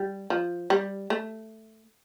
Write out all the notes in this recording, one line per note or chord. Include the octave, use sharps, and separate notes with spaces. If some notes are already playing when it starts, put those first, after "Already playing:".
Already playing: G3
F3
G3
A3